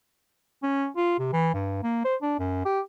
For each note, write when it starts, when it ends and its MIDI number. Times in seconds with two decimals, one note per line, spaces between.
0.63 0.87 61
0.96 1.15 65
1.19 1.28 48
1.33 1.50 52
1.54 1.80 43
1.83 2.00 58
2.04 2.15 72
2.22 2.37 62
2.39 2.61 42
2.65 2.80 67